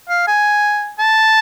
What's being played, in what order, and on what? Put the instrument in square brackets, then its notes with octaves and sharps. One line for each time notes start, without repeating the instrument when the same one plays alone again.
[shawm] F5
G#5
A5